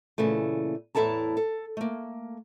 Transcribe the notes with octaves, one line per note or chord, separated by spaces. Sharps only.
A#2 C#3 E3 A3
E2 A2 E4 A4 A5 A#5
A4
A3 A#3